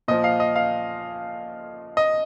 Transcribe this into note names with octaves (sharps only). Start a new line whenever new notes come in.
A#2 F3 D#5
F5
D#5
F5
D#5